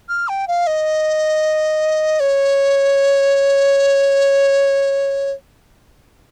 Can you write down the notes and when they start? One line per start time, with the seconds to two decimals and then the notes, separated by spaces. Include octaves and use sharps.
0.09 F6
0.28 G5
0.48 F5
0.67 D#5
2.20 C#5